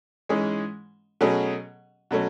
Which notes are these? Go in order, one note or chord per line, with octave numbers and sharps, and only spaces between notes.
G#2 E3 G#3 C#4 G#4
B2 F#3 A3 C#4 G#4
B2 F#3 A3 C#4